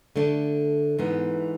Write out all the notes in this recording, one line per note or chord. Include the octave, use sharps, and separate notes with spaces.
D3 A3 D4
G#2 E3 B3